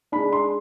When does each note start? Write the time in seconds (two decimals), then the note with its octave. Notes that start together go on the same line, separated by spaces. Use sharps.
0.12 G#3 D4 B5
0.33 C6